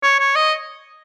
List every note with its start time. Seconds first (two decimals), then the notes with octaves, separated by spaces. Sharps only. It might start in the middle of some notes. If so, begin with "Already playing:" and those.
0.03 C#5
0.19 C#5
0.36 D#5